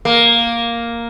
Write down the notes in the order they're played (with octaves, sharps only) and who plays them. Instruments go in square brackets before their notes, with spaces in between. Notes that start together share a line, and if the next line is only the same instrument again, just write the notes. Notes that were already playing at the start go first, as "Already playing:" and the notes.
[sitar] A#3